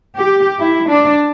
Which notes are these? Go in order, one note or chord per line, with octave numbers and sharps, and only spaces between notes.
G4
E4
D4